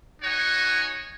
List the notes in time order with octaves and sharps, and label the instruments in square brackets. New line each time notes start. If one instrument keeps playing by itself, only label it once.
[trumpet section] D#4 F#4 C#5 F#5 G#5